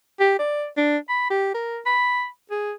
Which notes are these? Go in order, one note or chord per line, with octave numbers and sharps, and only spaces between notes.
G4
D5
D4
B5
G4
A#4
B5
G#4